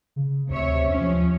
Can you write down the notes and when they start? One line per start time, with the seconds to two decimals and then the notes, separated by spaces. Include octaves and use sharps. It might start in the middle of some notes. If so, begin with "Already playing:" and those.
0.16 C#3
0.50 D2 C3 C#5 E5
0.88 D#2 F3 C#4